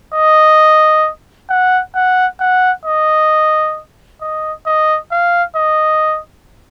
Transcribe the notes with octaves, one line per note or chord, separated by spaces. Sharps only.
D#5
F#5
F#5
F#5
D#5
D#5
D#5
F5
D#5